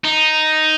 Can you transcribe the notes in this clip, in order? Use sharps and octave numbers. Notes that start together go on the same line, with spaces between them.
D#4